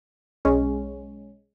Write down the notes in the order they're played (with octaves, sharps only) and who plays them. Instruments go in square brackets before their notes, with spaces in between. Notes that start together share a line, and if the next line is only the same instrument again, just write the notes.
[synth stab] B1 G#3 C#4